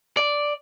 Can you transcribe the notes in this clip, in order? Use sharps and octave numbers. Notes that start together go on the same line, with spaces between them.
D5